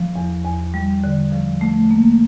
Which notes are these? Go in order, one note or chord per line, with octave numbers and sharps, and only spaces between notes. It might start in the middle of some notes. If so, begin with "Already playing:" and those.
Already playing: F3
E2
E2
G3
D3
F3
A3
A#3